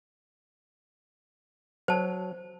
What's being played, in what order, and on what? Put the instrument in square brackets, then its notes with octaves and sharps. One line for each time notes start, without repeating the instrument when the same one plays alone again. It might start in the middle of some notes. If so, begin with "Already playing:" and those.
[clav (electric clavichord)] F#3 [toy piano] C5 A5